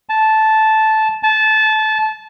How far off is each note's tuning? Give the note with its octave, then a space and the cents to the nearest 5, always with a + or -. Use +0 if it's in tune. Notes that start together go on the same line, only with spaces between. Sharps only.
A5 -10
A5 -20